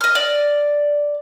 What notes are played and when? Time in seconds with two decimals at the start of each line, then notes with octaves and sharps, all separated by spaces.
0.01 D#5 F6
0.15 D5